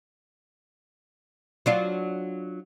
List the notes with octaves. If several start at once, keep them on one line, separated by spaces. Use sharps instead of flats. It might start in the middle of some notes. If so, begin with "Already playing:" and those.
F#3 D4 F4